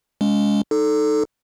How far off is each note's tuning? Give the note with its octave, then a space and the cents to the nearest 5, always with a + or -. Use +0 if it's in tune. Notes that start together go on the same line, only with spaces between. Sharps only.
G#3 +0 C#4 +35
D#4 -10 A4 +0